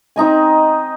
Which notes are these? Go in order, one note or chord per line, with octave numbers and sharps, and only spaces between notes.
C4 D#4 D#5 G#5